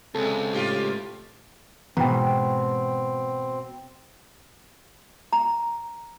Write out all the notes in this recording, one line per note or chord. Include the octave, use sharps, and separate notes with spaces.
C#2 C3 G#3 C4 A4
A2 F4 G4
G#2 B2 E3 C4 G5 A#5
A#5